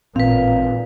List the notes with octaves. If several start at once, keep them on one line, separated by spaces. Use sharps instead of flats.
A1 A#2 C4 B4 F5